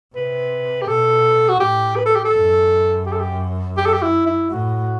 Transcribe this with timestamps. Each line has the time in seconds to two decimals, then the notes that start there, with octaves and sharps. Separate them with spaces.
0.15 C3 B4
0.82 G4
0.88 B2 A4
1.49 F#4
1.60 A2 G4
1.96 B4
2.06 A4
2.16 G4
2.25 A4
2.33 F#2
3.06 G4
3.13 A4
3.20 G4
3.77 G4
3.86 A4
3.93 G4
4.02 E4
4.26 E4
4.51 A2 F#4